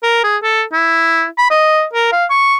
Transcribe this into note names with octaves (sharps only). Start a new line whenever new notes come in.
A#4
G#4
A4
E4
B5
D#5
A#4
F5
C#6